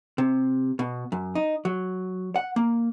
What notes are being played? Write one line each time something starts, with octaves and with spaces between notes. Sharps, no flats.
C3
B2
F#2
D#4
F#3
F#5
A#3